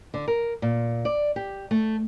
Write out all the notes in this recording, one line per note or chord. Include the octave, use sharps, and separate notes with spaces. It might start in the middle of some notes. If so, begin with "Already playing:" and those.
D3
A#4
A#2
D5
G4
A3